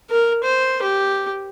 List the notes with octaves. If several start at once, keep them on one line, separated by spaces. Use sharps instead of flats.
A#4
C5
G4